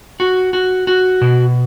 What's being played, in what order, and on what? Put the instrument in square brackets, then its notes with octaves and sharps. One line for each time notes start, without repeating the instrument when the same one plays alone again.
[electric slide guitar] F#4
F#4
F#4
B2